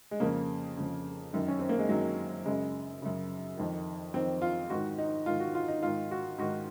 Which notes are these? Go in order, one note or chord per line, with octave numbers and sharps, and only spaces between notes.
G#3
F2 C#3 A#3
F2 C#3
F#2 D#3
C#4
C4
A#3
G#3
F#2 D#3 F#3
F#2 C#3 G#3
F#2 C#3
F2 D#3
F2 D#3 C4
F4
G#2 D#3 F#4
D#4
G#2 D#3 F4
F#4
F4
D#4
G#2 D#3 F4
F#4
G#2 D#3 F#4